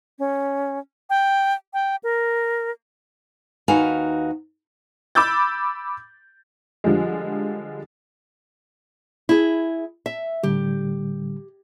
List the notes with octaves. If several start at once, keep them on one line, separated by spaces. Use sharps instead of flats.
C#4
G5
G5
A#4
D#2 D#4 F#4 B4 F5 G#5
B5 D6 E6 G6 A6
D3 F3 G3 G#3
E4 G#4
E5
A2 D3 G3 G4